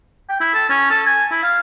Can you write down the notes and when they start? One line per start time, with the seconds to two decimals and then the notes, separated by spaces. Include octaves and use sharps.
0.29 G5
0.40 E4
0.54 A4
0.69 C#4
0.91 A4
1.06 G#5
1.31 E4
1.43 F5